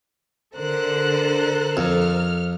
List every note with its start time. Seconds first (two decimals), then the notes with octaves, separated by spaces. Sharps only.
0.56 D3 A4 A#4 C5 F#6
1.77 F2 F6